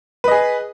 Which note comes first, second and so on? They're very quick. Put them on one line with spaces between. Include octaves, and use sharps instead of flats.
B4 D#5 G#4